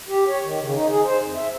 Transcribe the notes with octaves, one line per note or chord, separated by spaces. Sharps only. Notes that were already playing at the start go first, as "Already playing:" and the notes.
G4
C#5
D#3
C#3
D#4
G#4
C5
F2
E5